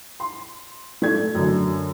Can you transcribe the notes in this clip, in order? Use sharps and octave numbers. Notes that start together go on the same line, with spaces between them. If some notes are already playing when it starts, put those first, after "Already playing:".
C6
A3 D5 G#6
F#2 D3